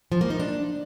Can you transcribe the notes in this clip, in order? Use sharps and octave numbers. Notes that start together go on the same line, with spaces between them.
F3
A#3
D#4
D4